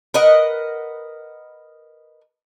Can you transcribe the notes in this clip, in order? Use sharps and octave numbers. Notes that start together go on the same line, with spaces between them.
A#4 B4 D#5 F#5